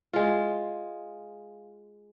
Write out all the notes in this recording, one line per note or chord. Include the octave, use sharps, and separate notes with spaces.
G#3 F4